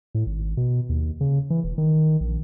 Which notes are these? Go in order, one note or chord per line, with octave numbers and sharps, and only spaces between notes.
A2
G#1
B2
D#2
C#3
E3
E1
D#3
A#1